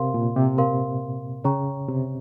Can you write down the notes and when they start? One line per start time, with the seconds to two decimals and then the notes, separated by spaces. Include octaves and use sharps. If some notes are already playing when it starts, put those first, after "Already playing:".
Already playing: C3 A#4 F5 C6
0.14 A#2
0.36 C3
0.58 A#4 F5 C6
1.44 C#3 C#5 G5 A#5 C#6
1.88 C3